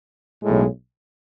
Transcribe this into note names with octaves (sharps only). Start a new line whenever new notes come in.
B1 A2 G#3